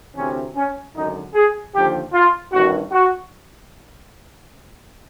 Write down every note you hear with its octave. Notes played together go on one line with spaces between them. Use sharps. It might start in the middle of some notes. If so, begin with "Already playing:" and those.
D2 C3 E3 C#4
C#4
G#1 F#2 D3 D#4
G#4
D#2 D3 F3 G4
F4
A1 G2 D#3 F#4
F#4